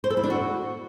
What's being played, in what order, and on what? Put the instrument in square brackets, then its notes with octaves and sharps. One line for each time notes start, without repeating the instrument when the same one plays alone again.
[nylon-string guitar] C5
A4
E4
D4
F#4